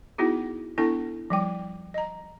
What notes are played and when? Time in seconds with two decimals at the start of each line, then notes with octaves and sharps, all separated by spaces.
0.18 B3 D#4 E4 F#4 G#4
0.78 B3 D4 E4 A4 G#5 C#6
1.30 F3 G3 G5
1.94 D#5 A#5